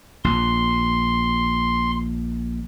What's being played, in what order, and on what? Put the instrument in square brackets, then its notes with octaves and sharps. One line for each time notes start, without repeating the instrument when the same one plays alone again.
[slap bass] A#1 [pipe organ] C6